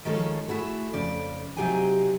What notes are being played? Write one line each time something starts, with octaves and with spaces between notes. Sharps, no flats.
D#3 F3 G#3 C#4 A4 C#5
A3 E4 F#4 G#4
F2 C#3 D5
C3 F#3 D#4 G4 G#4 G#5